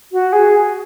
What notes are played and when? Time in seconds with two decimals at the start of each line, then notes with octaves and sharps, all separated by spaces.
0.12 F#4
0.32 G#4